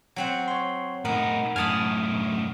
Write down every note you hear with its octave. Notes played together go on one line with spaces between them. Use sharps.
F#3 C4 F#5
C#5 C6
A2 B3 D#4 A#4
F#2 A2 G#5 A5 B5 D#6 F6